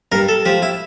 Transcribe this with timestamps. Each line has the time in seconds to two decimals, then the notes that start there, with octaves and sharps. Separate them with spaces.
0.12 G2 A#4
0.29 A4
0.45 F3 G4
0.62 E4